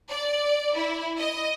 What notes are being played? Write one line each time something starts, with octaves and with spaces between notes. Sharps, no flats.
D5
E4
D#5